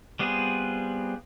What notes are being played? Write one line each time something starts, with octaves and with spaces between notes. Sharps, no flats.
G3 B3 C4 F4 G#4